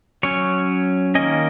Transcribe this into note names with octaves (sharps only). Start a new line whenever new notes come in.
F#3 C#4 C#5
D#3 A#3 C#4 D#5